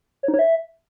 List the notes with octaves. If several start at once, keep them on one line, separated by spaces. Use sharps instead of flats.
C#5
D#4
C#5
E5